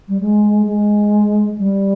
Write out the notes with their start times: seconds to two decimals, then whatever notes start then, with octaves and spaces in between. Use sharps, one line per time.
0.09 G3
0.21 G#3
0.66 G#3
1.58 G3